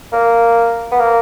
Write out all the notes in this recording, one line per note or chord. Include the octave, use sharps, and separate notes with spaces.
A#3
B3
A#3